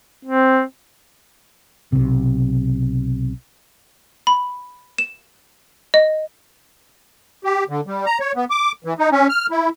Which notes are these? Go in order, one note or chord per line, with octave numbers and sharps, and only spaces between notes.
C4
B1 C3
B5
E7
D#5
G4
D3
G3
A#5
C#5
B3
D6
E3
D#4
C#4
F6
E4